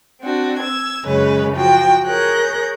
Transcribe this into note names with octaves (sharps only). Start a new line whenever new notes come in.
C4 D4 F#4
E6 G#6
F#2 C#3 G#3 C#4 B4
F3 F#4 G5
G#4 A#4 C#5 F#6 G6 A#6